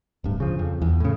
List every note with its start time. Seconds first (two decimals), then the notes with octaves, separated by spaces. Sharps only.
0.24 D1 G2
0.40 C#3 F3
0.59 F2
0.82 E2
1.00 A2 C#3